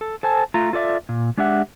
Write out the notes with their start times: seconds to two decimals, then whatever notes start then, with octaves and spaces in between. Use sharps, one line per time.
0.01 A4
0.23 A4 C5 G#5 A5
0.54 A3 F4 A#5
0.73 F4 A4 D5 E5
1.09 A#2
1.37 G#3 D4 G4 E5 F#5